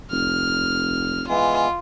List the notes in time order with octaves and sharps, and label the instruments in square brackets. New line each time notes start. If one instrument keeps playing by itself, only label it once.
[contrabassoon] F1 [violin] F6
[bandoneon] E3 G#3 B3 [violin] F4